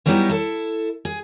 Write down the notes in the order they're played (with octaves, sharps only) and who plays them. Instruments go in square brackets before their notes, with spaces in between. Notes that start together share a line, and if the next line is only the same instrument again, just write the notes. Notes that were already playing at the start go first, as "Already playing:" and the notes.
[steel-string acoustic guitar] E3 F#3 G3 B3 D#4 E4
E4 A4
G#4